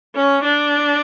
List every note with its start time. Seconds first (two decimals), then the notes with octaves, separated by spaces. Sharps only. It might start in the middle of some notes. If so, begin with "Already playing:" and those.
0.16 C#4
0.44 D4